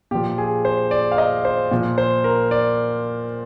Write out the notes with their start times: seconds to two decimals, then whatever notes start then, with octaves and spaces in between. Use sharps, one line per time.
0.11 A#2 F3 G4
0.38 G#4
0.65 C5
0.91 D5
1.12 F5
1.18 D#5
1.45 C5
1.71 A#2 F3
1.98 C5
2.24 A#4
2.51 D5